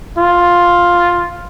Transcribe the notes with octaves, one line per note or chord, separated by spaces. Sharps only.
F4